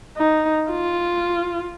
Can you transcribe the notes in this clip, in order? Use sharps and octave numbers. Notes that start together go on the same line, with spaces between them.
D#4
F4